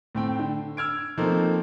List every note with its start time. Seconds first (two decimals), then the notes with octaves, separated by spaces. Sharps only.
0.15 A2 C4 G5
0.39 D3
0.77 E6 F6 G#6 D7
1.18 F3 A3 A#3 C4 D#4